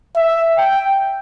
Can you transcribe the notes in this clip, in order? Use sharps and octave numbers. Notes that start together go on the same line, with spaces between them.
E5
G5